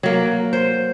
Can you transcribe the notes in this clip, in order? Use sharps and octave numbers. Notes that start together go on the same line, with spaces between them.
F#3 A#3
C5